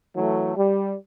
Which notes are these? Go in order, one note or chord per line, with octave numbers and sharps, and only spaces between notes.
E3 F#3 A3
G3